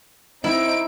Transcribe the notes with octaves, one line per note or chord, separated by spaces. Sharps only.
C4 D#4 E4 D7